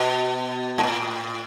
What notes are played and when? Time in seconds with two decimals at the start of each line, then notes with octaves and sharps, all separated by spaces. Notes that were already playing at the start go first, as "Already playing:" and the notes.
Already playing: B2
0.78 G#2
0.83 A2